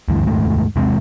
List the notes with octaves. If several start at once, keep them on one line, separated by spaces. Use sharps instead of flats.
D2 G2 E3
F1 D#2 G#2 A3
E2 C3 G#3 C4